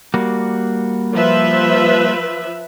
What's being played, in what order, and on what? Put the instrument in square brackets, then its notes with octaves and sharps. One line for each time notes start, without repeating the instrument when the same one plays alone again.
[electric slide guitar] G3 A#3 F#4
[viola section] F3 B4 E5